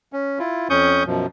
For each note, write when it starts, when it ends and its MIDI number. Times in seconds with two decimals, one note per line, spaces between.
0.13 0.39 61
0.39 0.68 64
0.39 0.68 65
0.70 1.03 41
0.70 1.03 61
0.70 1.03 85
0.70 1.03 87
0.70 1.03 91
1.07 1.26 42
1.07 1.26 47
1.07 1.26 53